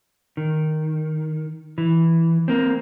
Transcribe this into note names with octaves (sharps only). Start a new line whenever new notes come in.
D#3
E3
A#3 C4